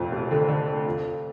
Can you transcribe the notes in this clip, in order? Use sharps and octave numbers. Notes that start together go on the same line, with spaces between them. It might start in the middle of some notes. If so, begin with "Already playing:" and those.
Already playing: F1 F2 A#2
F1
D3
D3
A3
F3
F3